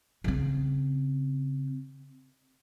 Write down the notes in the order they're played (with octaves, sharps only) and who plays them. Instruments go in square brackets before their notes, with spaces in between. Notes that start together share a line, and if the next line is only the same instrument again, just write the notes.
[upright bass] C#3 C4